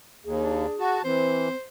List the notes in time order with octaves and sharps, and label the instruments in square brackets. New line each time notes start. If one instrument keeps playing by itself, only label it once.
[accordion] D#2 [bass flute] G#4
[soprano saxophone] D4
[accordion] F#4 [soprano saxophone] A5
[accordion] E3 [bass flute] C4 [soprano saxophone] C5